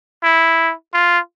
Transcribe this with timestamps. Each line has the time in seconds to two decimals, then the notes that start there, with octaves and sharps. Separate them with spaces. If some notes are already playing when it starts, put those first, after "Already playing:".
0.23 E4
0.94 F4